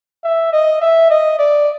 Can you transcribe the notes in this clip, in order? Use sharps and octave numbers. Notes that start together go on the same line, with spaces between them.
E5
D#5
E5
D#5
D5